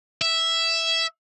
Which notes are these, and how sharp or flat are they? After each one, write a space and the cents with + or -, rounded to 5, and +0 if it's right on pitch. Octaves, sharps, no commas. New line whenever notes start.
E5 +0